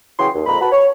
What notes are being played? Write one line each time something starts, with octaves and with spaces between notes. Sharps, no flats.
C#3 E3 F#3 G#4 G5 C6
D#2
F2 A#2 G#3 C4 A#5 B5
F#4 B4 A5 B5
C#5